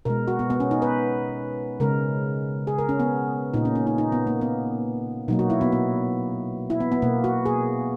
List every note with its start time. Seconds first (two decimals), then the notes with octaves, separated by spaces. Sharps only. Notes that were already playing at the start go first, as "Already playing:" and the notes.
0.05 B2 G#3 A#4
0.28 F#4
0.39 B3
0.50 B3
0.60 C#4
0.71 D#4
0.82 B4
1.80 C#3 G#3 A#4
2.67 G#4
2.78 A#4
2.89 C#4
3.00 B3
3.54 A#2 A#3 D#4
3.65 C#4
3.75 C#4
3.87 D#4
3.98 D#4
4.12 B3
4.27 A#3
4.41 B3
5.28 B2 F#3 A#3 D#4
5.39 F#4
5.50 E4
5.61 B3
5.72 B3
6.70 E4
6.80 B3
6.92 B3
7.02 B2 A#3
7.24 F#4
7.46 G#4